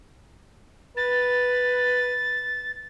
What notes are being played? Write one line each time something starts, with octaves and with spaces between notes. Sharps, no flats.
B4 A6